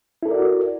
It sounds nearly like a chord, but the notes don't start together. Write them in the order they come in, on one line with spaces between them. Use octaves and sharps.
E4 A4 A#4 D5 F#4